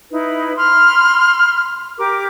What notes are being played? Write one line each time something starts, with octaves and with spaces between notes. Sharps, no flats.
D#4 E4 B4
B5 C6 F6
G4 A#4 D6